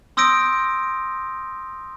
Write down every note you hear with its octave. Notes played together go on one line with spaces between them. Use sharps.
C6 D#6 E6 G6 A#6 D7